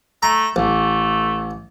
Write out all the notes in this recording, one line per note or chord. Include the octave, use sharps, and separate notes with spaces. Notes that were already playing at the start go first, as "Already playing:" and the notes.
A3 A#5
A1 A3